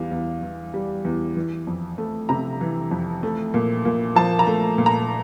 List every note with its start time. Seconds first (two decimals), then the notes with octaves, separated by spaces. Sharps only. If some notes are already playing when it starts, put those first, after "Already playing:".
Already playing: E2 G3 F5
0.11 E2
0.42 E3
0.74 G3
1.05 E2
1.37 E3
1.67 F2
1.98 A3
2.29 C3 A#5
2.61 E3
2.91 F2
3.23 A3
3.54 A#2
3.85 A#2
4.16 F3 A5
4.39 A#5
4.47 A3
4.78 A#2
4.86 A#5